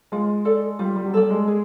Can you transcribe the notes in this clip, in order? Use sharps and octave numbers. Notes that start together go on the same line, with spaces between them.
G#3 F4
A4 D5
G3 F4
G3
F#3
G3 A4 D5
G#3
G#4